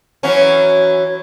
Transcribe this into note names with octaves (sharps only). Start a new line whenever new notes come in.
E3 F#3 C#4